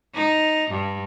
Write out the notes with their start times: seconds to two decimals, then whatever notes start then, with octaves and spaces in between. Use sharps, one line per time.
0.15 D#4
0.71 G2